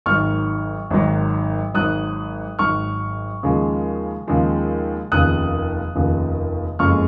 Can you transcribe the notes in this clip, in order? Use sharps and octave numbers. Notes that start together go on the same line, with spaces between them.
G#1 G#2 D#3 F#3 C#6 F6
G#1 G#2 D#3 F#3
G#1 G#2 F#3 D#6 F#6
G#1 G#2 F#3 C#6 F6
D#2 C#3 F3 G#3
D#2 C#3 F3 G#3
F1 D#2 C#3 F3 D#6 F#6
F1 D#2 C#3 F3
F#1 F2 C#3 G#3 C#6 F6